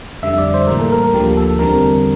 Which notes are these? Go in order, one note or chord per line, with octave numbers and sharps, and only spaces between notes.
F2 D3 G3 E5
D5
C5
A2 E3 G3 A#3 A#4
A4
A#4
D2 D3 F3 A#3 G4
A4
E2 D3 G3 C4 A#4